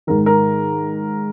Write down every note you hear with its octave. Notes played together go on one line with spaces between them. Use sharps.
G#2 D#3 A#4
A#4